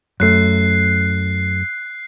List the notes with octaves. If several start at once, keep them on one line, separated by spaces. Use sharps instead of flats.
F#2 A3 F#6 C7